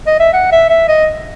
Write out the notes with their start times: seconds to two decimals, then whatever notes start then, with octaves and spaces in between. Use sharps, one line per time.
0.07 D#5
0.19 E5
0.33 F#5
0.52 E5
0.70 E5
0.88 D#5